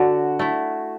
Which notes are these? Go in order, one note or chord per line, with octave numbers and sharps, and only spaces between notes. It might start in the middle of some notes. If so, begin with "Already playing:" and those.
Already playing: D3 F#4
A3 E4